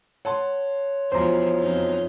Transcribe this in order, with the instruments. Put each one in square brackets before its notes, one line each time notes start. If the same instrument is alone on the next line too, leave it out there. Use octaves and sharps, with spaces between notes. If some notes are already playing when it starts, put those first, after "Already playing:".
[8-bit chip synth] C#5 [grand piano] F#5 A5 C6
[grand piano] E1 E2 [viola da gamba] F3 [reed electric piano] C5 A#5
[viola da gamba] F2 D#4